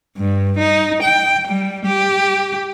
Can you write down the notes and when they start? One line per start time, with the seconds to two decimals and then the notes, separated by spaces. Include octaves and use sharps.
0.18 G2
0.58 D#4
1.03 G5
1.48 G3
1.86 G4